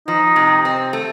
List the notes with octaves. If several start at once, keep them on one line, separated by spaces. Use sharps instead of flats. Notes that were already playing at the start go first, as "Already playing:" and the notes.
F3 D#4
C3
C4
A3